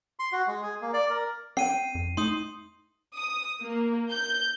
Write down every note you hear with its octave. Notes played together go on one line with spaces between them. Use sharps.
C6
F#4
G#3
G#4
A#3
D5
A#4
C4 G5 C7 D#7
F2
A3 D#4 C6 D#6
D#6
A#3
G6